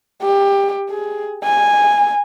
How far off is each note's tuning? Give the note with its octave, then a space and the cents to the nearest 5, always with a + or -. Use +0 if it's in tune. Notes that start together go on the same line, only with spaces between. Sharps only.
G4 +20
G#4 +15
G#5 -10